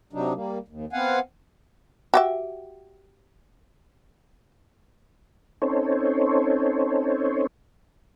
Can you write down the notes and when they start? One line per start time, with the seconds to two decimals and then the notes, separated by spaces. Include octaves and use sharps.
0.13 C3 F#3 D4 D#4
0.34 G3 A#3
0.68 D#2
0.93 B3 C4 F5 F#5 G#5
2.14 F#4 G4 E5
5.62 C4 C#4 D#4 A4 C5 C#5